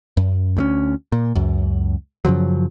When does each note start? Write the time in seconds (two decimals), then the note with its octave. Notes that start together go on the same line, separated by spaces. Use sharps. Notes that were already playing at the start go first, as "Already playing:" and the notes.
0.17 F#2
0.57 D2 A3 C#4
1.12 A#2
1.35 C#2 F#2
2.25 F#2 C#3 F3 F#3